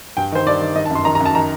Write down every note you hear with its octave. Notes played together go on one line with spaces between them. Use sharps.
G2 G5
D#3 C5
G2 D5
D#3
D#3 D#5
A5
F#2 C6
D#3 A#5
A#5
F#2 A5
D#3 A#5